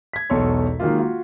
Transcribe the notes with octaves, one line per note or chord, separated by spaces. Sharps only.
G#6 B6
E1 B1 E2 A4 C#5 C6
D#3 F#3 G#3 A#3 F4
F4 F#4